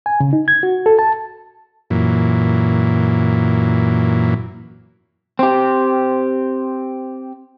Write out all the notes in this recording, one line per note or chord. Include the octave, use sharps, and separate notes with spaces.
G#5
C#3
D#4
G#6
F#4
A4
A5
F#2 A#2 E3
C4 G4